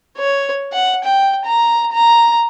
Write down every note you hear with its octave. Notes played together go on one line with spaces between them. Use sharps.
C#5
F#5
G5
A#5
A#5